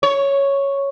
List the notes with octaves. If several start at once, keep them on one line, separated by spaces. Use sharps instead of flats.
C#5